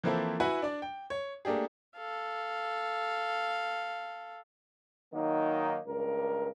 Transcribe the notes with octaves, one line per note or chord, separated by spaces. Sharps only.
E3 F3 A#3 C4 E4 A4
E4 F#4 B4 F#5 G#5
D4 D5
G5
C#5
A3 A#3 D4 G4 G#4
A4 F5
D#3 F#3 A#3 D#4
C#2 G2 A#4